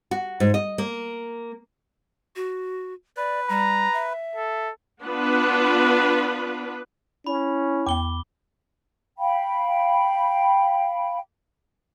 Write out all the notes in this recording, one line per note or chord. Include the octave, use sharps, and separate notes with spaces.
F#4
G#2
D#5
A#3
F#4
B4 D5
G3 A#5
E5
A4
B3 D4 F4 B4
C#4 E4 B5
E2 B3 G5 D6 G7
F5 G5 B5